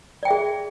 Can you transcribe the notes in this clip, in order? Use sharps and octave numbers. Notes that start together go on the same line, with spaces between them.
G#4 D5 E5 G5